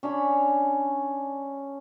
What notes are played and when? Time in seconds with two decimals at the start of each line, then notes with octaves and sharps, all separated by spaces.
0.03 C#4 D4 C#5 B5